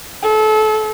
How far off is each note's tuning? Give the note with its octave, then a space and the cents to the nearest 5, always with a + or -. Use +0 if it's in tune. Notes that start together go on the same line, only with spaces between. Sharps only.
A4 -30